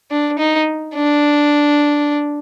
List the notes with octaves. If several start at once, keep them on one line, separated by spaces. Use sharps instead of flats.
D4
D#4
D4